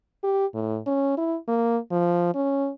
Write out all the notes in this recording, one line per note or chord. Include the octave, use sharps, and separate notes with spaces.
G4
A2
C#4
E4
A#3
F3
C#4